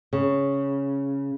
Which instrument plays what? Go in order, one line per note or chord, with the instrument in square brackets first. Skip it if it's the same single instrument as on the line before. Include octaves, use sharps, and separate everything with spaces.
[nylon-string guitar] C#3